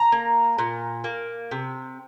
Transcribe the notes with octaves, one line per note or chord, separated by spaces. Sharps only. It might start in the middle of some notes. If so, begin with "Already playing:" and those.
Already playing: A#5
A#3
A#2
A#3
C3